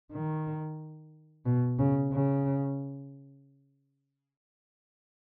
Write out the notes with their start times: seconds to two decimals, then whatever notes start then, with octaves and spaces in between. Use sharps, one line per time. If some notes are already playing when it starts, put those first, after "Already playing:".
0.12 D#3
1.45 B2
1.79 C#3
2.12 C#3